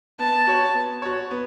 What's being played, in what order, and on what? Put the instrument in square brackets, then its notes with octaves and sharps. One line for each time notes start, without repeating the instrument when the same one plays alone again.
[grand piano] B3 [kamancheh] A5
[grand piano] F#4 C#5
B3
F#4 C#5
B3